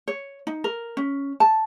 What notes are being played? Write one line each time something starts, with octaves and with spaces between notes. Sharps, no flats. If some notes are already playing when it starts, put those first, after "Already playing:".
C#5
D#4
A#4
C#4
A5